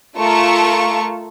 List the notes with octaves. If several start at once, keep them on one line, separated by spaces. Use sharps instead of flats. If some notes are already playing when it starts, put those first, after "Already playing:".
A3 F4 A#4 A5 C#6